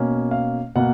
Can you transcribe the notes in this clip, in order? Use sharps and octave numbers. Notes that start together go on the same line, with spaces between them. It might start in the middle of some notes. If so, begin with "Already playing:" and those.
Already playing: B2 A#3 C#4
F5
B2 A#3 F#5